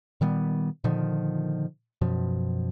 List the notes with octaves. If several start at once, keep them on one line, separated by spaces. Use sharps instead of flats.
A#2 D#3 G3 B3
A#2 D3 D#3 F3
F#2 B2 F3